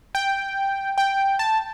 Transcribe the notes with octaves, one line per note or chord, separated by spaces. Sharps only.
G5
G5
A5